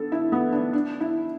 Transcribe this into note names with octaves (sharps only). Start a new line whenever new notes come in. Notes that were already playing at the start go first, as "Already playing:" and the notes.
Already playing: B3 D4 A4
E4
B3
D4
D4
E4